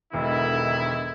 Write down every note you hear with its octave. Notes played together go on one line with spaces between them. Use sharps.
E1 D3 D#3 E4